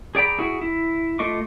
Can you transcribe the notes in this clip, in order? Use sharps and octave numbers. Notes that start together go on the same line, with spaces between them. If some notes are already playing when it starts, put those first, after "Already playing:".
G#4 D5 G5 A#5 B5
E4 F#4 G#4
E4
A3 F4 D#5 C#6 D6